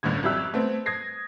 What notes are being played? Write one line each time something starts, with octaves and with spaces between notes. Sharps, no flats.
G1 C#2 A2 D3 G#6
G#1 F2 G4 E5 E6 F#6
A3 B3 C4
D#6 G#6 A#6 C7